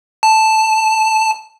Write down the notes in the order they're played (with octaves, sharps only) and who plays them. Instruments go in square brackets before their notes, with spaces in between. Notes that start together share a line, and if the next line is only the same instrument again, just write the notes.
[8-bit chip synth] A5